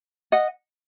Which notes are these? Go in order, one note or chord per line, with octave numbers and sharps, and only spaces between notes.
D#5 F#5